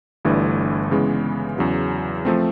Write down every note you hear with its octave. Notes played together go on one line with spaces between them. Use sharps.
G1 G2 E3 A3 D4
C#3 E3 G#3 B3
E2 C#3 F#3
F3 A3 C4